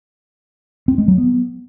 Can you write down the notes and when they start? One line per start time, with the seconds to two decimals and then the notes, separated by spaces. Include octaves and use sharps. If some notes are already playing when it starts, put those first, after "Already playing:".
0.88 C4
0.98 G#3
1.08 F#3
1.18 B3